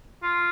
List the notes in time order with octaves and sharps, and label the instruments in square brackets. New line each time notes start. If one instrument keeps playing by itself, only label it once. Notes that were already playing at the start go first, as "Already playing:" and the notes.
[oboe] F4